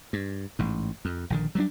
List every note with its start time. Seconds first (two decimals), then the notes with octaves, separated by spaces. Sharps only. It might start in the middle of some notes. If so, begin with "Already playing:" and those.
0.13 G2
0.59 A1 G#2
1.05 F2
1.30 A#1 D3 D#3
1.55 F#3 G3 A3 D4